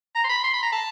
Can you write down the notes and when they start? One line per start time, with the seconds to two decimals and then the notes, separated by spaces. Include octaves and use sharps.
0.16 A#5
0.25 C6
0.30 B5
0.44 C6
0.54 B5
0.63 A#5
0.73 A5